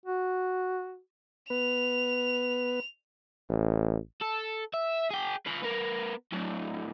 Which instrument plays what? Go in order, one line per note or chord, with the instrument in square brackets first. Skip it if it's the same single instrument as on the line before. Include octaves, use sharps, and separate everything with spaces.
[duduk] F#4
[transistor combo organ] B3 B4 [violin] F7
[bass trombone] A1
[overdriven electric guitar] A4
E5
G#4 G5
F4 B4
B3 A#4
A2 F#3